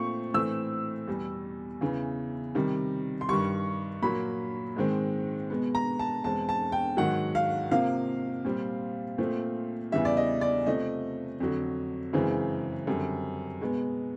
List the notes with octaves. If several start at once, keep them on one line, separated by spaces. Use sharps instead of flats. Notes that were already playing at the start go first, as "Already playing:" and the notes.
Already playing: A#2 F3 A3 C4 C#6
A2 E3 A3 C4 E6
E2 B2 G3
E2 C#3 E3
C3 D#3 G3
C6
G2 D#3 G3 C#6
A#2 F#3 A#3 B5
G#2 D#3 G#3 C4
B2 G#3 B3
A#5
A5
E2 B2 G#3 C4 A5
A5
G5
G#2 D#3 F#3 F#5
F5
C3 F3 A#3 F5
A#2 G3 C4
A#2 F3 A3 C4
E2 C#3 E3 G3 E5
D5
D#5
D5
C3 F3 A3 D#5
F2 D3 F#3
F#2 C#3 E3 G#3 C4
F#2 D3 G3 C4
B2 G#3 B3